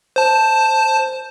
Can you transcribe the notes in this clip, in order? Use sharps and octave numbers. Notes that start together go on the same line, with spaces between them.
C5 A5